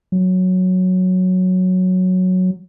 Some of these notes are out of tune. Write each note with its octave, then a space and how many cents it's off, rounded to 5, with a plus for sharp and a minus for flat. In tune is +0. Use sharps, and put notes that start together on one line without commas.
F#3 -5